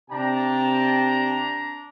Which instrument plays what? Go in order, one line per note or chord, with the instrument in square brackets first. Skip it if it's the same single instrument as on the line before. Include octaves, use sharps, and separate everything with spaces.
[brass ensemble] C3 G5 A5 [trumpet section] D4 A#5